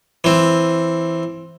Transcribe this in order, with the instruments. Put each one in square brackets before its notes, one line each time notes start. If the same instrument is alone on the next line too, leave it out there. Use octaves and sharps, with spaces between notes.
[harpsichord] E3 C4